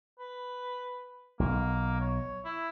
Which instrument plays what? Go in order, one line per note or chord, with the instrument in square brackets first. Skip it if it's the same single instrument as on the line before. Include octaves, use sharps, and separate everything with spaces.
[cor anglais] B4
[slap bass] B1 [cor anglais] A#3
[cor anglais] C#5
E4